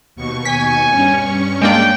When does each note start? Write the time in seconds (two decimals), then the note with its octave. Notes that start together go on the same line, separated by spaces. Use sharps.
0.15 D#2 B2 C#6
0.45 G#5 B6
0.90 G2 C#4 C#6
1.62 G#3 A#3 D4 G5